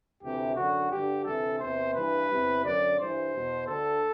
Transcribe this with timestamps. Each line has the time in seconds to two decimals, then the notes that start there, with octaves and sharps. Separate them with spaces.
0.21 D2 C3 E3 G4
0.55 F#2 D3 F#4
0.90 G2 D3 G4
1.24 D2 C3 E3 A4
1.59 E2 C3 E3 C5
1.94 G2 E3 B4
2.29 E2 C3 E3
2.64 F#2 D3 D5
2.99 G2 E3 C5
3.34 E2 B2
3.67 D2 D3 A4